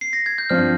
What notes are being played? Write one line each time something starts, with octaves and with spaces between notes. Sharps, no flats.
C7
A#6
G#6
G6
G2 F3 C4 F6